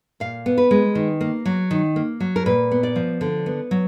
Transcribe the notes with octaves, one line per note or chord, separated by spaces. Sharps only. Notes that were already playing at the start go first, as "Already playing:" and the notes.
A#2 F5
B3
B4
G#3
D#3
A#3
F#3
D#3
A#3
F#3
A#4
A#2 B4
B3
D5
F3
D3
B3
F#3